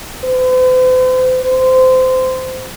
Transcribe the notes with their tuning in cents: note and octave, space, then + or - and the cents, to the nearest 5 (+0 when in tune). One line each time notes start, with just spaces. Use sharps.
C5 -45
C5 -20